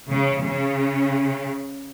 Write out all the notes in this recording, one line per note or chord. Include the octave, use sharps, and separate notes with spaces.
C#3
C#3